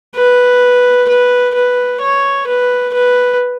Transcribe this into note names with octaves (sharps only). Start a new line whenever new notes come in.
B4
B4
B4
C#5
B4
B4